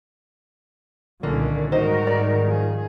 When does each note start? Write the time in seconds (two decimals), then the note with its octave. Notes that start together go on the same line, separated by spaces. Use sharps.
1.23 C2 A#2 D3 D#3 A#3 C#4 D4
1.72 G#2 D#3 G3 D#4 F#4 A#4 C5 D#5
2.07 D5
2.48 F3 G#4